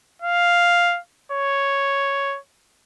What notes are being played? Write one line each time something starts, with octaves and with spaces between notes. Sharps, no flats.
F5
C#5